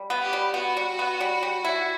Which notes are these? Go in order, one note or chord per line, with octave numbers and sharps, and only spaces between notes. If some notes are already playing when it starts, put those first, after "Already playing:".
Already playing: G3
B3
G4
G3
B3 F#4
G3
B3
G3
G3
E4